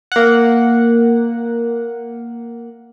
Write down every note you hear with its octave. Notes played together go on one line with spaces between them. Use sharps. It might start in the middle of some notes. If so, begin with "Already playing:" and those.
A#3 F#5